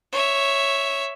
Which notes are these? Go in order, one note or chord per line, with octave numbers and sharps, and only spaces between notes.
C#5 E5